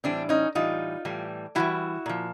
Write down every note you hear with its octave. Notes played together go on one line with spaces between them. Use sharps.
A2 E3 G3 C4 D4
C#4 D#4
A2 E3 G3 D#4 F4
A2 E3 G3
A2 E3 G3 E4 F#4
A#2 F3